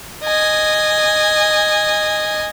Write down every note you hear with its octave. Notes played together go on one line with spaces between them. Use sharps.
D#5 G#5